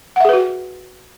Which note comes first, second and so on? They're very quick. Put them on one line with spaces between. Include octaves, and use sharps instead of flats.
F#5 E5 G#4 B4 F#4